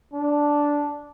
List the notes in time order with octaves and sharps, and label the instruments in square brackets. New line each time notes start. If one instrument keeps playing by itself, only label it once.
[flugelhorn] D4